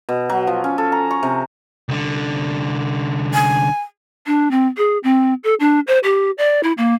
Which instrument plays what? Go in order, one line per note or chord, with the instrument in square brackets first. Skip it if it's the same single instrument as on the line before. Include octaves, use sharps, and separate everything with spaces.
[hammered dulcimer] B2
F#3
F3
C#4
A4
A#5
C#6
C3
[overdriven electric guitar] C2 D3
[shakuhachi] G#5
[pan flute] D4
C4
G#4
C4
A4
D4
C5
G4
D5
E4
A#3